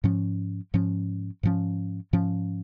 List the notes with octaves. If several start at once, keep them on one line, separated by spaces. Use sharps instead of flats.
G#2 F3 C#4
G#2 F3 C#4
G#2 F3 C#4
G#2 F3 C#4